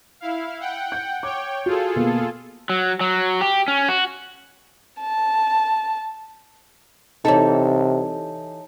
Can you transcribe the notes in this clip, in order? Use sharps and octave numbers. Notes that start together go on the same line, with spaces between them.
E4 F5
F#5 G5
G6
C#5 G5 D6
F4 F#4 G#4 A4
B2 A#3 B3
F#3
F#3
G4
C#4
F#4
A5
C3 E3 D#4 G4 A4 C#5 A5